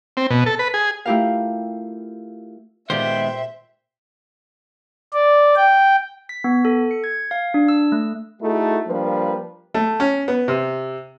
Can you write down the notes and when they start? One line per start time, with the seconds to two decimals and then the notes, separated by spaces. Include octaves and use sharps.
0.17 C4
0.31 B2
0.46 A4
0.59 B4
0.74 G#4
1.05 A3 E4 F4 G4 A#4 F5
2.90 A#2 D#3 G#3 B3 G4 C5 E5 G5
5.13 D5
5.56 G5
6.29 B6
6.44 B3
6.65 A4
6.91 C#7
7.04 G#6
7.31 F5
7.54 D4
7.68 E6
7.92 A3
8.42 A3 D#4 E4 F#4 G#4 A4
8.88 F3 G3 A#3 D4 B4
9.74 A3
10.00 C#4
10.28 B3
10.48 C3